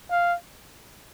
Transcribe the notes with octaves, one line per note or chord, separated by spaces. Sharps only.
F5